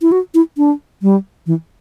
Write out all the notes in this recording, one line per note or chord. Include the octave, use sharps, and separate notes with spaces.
E4
F#4
E4
D4
G3
E3